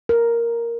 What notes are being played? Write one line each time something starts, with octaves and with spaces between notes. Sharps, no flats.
A#4